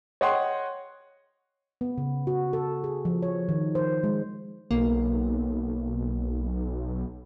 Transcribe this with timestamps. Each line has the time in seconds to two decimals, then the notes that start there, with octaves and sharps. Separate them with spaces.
0.21 C#5 D#5 F#5 G5 C6
1.81 B3
1.98 C#3
2.27 F#4
2.53 A4
2.84 G#4
3.05 F3
3.22 C#5
3.49 D#3
3.75 C5
4.04 G#3
4.71 B1 A#3